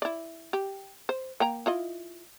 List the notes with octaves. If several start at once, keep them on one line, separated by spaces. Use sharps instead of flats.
E4 D5
G4
C5
A#3 G5 A#5
E4 F4 D#5